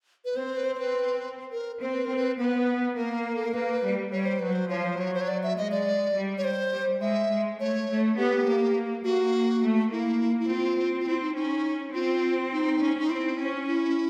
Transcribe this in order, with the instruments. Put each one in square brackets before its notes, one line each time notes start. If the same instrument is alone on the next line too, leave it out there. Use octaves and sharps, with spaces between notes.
[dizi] B4
[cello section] C4 [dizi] C5
[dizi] B4
C5
C5
B4
A#4
[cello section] C4 [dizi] C5
[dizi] B4
A#4
[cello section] C4
[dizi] B4
[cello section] B3 [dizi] B4
[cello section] A#3 [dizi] A#4
[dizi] A4
A#4
[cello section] A#3 [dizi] B4
[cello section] G3
[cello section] G3 [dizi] C#5
[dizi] C5
[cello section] F#3 [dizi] B4
[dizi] C5
[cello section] F3 [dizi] C#5
[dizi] C5
[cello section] F#3 [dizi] C#5
[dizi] C5
C#5
D5
E5
[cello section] G#3 [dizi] D#5
[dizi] D5
[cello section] G3
[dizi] C#5
C5
[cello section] G3
[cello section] G#3 [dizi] E5
[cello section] G#3
[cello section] A3 [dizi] C#5
[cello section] A3
[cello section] B3 [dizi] G4
[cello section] A#3
[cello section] A#3 [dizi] F#4
[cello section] A3
[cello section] A#3 [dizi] E4
[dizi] E4
[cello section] C4 [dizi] F4
[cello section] C4
[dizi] F4
[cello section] C4 [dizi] E4
[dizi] D#4
[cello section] C#4 [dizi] D#4
[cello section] C4 [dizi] F4
[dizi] D#4
[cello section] C#4
[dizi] D#4
[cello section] C4 [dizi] E4
[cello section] C#4
[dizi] E4